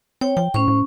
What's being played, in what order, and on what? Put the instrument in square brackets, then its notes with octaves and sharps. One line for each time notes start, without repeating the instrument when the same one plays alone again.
[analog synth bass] C4 [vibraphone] C#5 G5
[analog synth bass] F3 [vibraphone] G5
[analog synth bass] A2 [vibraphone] C#4 C5 C#6
[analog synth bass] A2